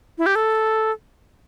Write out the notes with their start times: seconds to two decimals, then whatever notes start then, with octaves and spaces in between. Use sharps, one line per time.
0.18 E4
0.26 G4
0.35 A4